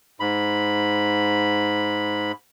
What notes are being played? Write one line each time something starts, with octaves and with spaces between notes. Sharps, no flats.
G#2 B5